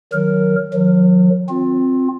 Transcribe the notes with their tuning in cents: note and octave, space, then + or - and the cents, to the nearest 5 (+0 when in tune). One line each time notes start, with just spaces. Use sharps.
D#3 +0 F#3 +5 A#4 +0
D#3 +0 F#3 -35
C4 +0 F4 +25